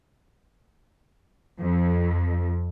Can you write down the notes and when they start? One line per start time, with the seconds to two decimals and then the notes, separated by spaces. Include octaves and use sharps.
1.60 F2